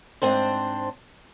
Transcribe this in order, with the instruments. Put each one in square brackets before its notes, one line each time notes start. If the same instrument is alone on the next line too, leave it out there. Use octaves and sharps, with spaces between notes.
[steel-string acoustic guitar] G#2 C4 D4 C5